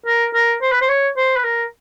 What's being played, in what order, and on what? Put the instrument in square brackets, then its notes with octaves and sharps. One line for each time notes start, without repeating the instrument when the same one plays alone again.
[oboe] A#4
A#4
C5
B4
C5
C#5
C5
B4
A#4